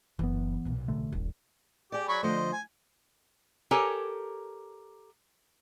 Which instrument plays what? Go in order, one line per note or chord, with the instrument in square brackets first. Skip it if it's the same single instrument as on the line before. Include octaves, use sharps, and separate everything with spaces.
[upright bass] F#1 [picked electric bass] E3 B3
[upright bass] B1 A#2
[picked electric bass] A1 D3 A3
[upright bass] D#1 [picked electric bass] G#1
[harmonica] G4 [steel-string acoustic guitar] G#4 D5
[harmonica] F#3 B5 C#6
[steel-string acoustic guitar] D3 F3 A3 [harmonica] C5 D#5
[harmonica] G#5
[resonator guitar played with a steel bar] G4 A4 A#4 C#5 G#5